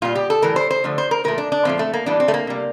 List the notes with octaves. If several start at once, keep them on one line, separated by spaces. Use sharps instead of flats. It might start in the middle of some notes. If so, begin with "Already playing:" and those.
A#2 G3 F4
G4
A4
A2 E3 G3 A#4
C5
C5
D3 F3 A3
C5
A#4
A#2 F3 A3 A#4
D4
D4
A#2 F3 A3 C4
A3
A#3
A2 E3 G3 D4
C4
A3
A#3
C3 G3